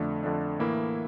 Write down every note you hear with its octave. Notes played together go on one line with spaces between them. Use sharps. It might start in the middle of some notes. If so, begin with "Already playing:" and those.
Already playing: F2 D3 A3 D4
F2 D3 A3 D4
A2 E3 A#3 E4